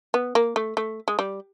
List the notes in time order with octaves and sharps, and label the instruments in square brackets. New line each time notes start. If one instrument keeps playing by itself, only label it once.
[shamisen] B3
A#3
A3
A3
G#3
G3